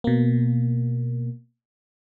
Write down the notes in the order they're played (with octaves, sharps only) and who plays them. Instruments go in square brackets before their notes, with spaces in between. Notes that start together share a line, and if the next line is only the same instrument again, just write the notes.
[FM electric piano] B2 A#3